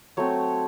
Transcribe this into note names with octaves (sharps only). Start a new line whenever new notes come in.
F#3 A3 C4 C#5